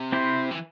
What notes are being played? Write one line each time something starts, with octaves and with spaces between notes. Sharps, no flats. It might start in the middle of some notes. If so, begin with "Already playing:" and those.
Already playing: C3
C4 E4 G4 C5
E3